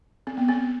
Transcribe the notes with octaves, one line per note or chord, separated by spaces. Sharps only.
C4
B3
C4